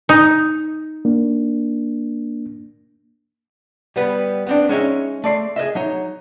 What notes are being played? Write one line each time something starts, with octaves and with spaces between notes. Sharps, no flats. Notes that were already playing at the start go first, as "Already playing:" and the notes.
D#4
A#3 D4
G3 B3 B4
B3 C4 D4
G#3 C#4 D#4 E5
A3 D5 C6
G#4 B4 D#5 E5
F#3 D#4 C#5